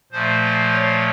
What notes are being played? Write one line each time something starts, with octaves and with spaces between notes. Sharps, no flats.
A#2 F3 A3 C5
C#5